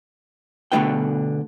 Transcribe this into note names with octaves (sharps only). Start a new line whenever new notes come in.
B2 D3 A3 E4 B4 G5